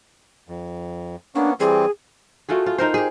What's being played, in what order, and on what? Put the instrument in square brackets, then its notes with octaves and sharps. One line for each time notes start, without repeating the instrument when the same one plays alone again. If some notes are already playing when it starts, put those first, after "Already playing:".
[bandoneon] F2
[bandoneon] A#3 B3 C#4 [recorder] D4
[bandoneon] E3 G3 C4 [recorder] G#4
[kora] A3 F4 F#4 G#4
F4
D#4 A#4 C5
G4 G#4